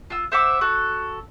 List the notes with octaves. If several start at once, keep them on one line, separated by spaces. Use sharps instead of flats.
F4 E6
C5 E5 F#5 D6
F#4 A4